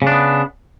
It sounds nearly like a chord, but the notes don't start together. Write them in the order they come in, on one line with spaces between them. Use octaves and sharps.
C#3 D4 B3